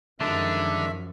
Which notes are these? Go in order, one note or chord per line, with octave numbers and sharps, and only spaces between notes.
F#2 D3 D#3 F3 G#3 D4 E5